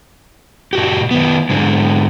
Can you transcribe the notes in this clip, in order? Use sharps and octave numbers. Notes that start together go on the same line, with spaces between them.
A#2 F#4 G4
D#3 B3
G#2 D3 G#3